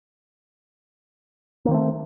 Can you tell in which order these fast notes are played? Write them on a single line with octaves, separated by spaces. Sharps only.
A#3 D#3 C4 A3